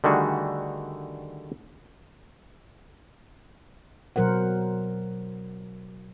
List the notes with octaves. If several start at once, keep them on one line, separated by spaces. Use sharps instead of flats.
D3 D#3 G3 A3 F#4 G#4
B2 F#3 A#4 C5 F#5